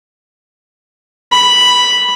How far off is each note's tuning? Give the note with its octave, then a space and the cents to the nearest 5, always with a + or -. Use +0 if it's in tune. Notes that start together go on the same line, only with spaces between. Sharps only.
B5 -5